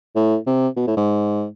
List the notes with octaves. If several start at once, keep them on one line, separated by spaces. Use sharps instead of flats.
A2
C3
B2
A2
G#2